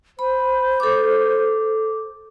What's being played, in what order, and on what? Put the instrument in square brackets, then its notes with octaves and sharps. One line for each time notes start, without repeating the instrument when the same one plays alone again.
[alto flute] C5 [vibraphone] B5
[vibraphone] A4 D6